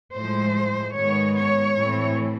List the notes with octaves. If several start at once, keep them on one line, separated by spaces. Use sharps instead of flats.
A2 F3 G#3 C5
G#2 D#3 G#3 B3 C#5
C#5
A2 E3 A3 C4